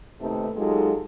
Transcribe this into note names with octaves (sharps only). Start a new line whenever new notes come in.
D#2 C3 A3 D#4 A4 B4
F#3 G#3 D#4 F4 G4 A4